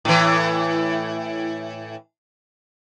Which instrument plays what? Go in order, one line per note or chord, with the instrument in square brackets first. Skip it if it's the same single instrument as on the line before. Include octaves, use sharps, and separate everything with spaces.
[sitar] A2 E3